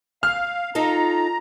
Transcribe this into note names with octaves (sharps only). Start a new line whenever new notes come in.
F5 F6
D#4 F4 A4 A#5